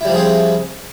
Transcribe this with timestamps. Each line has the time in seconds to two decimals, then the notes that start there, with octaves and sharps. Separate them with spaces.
0.01 E4
0.05 G3
0.09 F3
0.13 G#4
0.18 C4